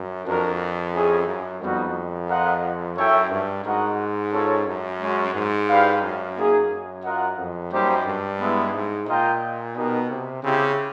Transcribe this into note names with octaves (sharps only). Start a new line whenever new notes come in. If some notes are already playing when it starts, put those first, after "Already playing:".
Already playing: F#2
F2 D4 F#4 A#4
C#4 E4 G#4
F#2
F2 G3 B3 D#4 F#4
F4 A#4 D#5 F#5
F#2 E4 A4 C#5 E5 G5
G2
G#2 F#4 A#4 D#5 F#5
C#4 F4 A4 C#5
F#2
G#3 C#4 F#4
G#2
E4 G4 B4 D5 F5
F#2
A#3 D#4 G#4
F#2
F4 A#4 D#5 F#5
F2
F#2 G3 A#3 D#4 G4 C5
G2
G#3 B3 E4
G#2
A#2 F4 A#4 D#5 G5
B2 B3 D#4 G4 A#4
C3
C#3 C4 E4 G4